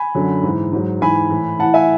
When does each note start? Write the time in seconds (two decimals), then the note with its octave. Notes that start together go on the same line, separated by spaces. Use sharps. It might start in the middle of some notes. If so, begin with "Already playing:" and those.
Already playing: G#5 B5
0.15 F#2 D3 F#3
0.43 G#2 E3
0.72 G#2 F#3
1.01 G#2 E3 G#5 B5
1.30 A2 E3
1.59 A2 E3 F#5 A5
1.74 E5 G#5